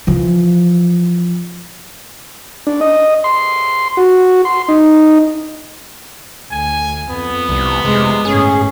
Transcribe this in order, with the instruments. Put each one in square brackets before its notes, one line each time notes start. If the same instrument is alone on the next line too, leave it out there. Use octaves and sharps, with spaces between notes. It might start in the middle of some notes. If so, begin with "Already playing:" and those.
[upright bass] E3 F3
[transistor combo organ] D4
D#5
C6
F#4
C6
D#4
[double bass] D2 [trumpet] G#5
[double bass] F2 [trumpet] B3
[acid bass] C2 [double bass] G3
[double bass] F1 [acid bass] C3 [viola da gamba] G#3
[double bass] G1 A2 [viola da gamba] C#4 [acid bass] G#4